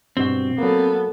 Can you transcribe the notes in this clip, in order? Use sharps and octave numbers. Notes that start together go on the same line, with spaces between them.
G2 B2 C4 F#4
F#3 A#3 B3 A4